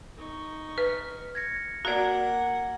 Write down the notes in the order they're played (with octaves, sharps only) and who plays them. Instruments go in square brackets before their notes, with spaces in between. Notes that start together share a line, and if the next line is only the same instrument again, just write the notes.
[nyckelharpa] D#4 C#6
[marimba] B4 [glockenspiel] F6
[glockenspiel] G#6 A#6 C#7
[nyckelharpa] A#3 F#5 [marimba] F#4 D5 [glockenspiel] A#5 G#6